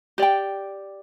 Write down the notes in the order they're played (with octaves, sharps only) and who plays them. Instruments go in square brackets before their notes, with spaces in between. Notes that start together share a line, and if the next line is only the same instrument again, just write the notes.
[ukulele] G4 D5 G5